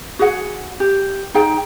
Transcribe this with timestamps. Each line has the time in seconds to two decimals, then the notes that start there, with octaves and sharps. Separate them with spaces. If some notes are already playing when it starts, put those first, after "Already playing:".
0.19 F#4 G#4 F#5
0.80 G4
1.34 D#4 G#4 G5